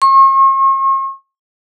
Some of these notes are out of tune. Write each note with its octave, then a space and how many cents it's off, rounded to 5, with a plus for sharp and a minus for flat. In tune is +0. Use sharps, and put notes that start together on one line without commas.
C#6 -45